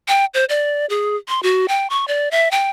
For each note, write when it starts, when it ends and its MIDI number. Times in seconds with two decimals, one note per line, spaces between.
0.08 0.25 79
0.34 0.45 72
0.49 0.86 74
0.90 1.16 68
1.29 1.40 84
1.43 1.66 66
1.68 1.87 79
1.90 2.05 85
2.08 2.29 74
2.31 2.51 76
2.51 2.70 79